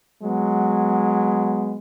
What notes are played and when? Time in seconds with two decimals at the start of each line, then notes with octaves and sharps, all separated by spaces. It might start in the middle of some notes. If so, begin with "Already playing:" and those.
0.21 F#3 G#3 B3